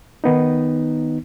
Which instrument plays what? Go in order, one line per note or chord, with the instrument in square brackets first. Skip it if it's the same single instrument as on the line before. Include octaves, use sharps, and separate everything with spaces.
[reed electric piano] D#3 B3 D#4